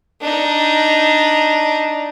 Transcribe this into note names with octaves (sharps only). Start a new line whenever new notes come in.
D4 D#4